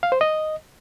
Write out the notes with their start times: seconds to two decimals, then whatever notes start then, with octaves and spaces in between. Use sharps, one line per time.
0.03 F5
0.12 C5
0.21 D#5